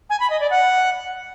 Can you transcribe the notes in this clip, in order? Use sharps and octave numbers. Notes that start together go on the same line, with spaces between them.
G#5
B5
D#5
D5
F#5